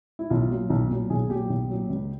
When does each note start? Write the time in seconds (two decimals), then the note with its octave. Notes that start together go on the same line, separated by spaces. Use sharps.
0.19 E4
0.30 B1 F4
0.50 A#2 F#3
0.70 B1
0.90 A#2 F#3
1.10 B1 G#4
1.29 A#2 F#3 G4
1.50 B1
1.70 A#2 F#3
1.90 C#2